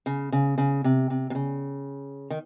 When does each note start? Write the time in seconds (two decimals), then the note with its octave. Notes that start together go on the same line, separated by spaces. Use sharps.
0.06 C#3
0.32 C#3
0.58 C#3
0.84 C3
1.10 C3
1.30 C3
1.35 C#3
2.30 D#3